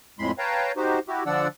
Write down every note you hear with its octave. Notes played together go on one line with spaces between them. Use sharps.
F2 A2 G#3 B5 C6
B4 C#5 F5 G5 A5 A#5
D#4 F#4 G4 C5
E4 F#4 G4
D3 F3 D4 D5 F#5 E6